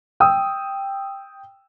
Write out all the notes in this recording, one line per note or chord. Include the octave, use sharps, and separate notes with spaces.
G5 D#6 E6